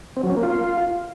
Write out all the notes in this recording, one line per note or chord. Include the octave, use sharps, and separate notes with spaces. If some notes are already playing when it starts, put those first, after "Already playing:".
C4
F#3
C#4
A#3
F4